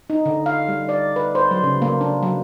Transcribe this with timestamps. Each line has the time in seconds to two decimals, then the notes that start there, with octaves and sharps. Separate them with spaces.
0.10 D#4
0.26 D3
0.46 F5
0.68 G3
0.89 D5
1.16 B4
1.35 C5
1.51 F#3
1.63 C#3
1.82 A#3
2.01 D4
2.23 F#3